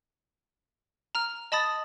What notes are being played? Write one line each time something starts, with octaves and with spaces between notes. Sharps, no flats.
A#5 F6
D#5 A5 B5 D#6 A6